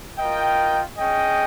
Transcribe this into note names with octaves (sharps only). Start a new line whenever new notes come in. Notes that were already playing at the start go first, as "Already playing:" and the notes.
F4 A#4 D#5 G5
C#4 G#4 D#5 G5